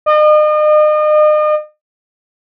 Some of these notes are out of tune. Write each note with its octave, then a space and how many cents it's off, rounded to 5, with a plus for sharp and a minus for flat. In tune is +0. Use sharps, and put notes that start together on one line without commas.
D#5 -40